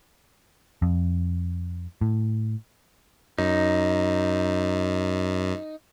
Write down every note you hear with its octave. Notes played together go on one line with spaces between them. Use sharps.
F2
A2
F#2 D#4